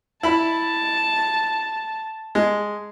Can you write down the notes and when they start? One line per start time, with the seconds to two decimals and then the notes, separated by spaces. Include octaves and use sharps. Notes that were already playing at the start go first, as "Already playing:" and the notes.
0.23 E4 A5 B5
2.35 G#3